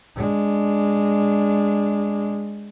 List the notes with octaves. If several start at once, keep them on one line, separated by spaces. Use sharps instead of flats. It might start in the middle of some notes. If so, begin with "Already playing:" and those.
G#3 D4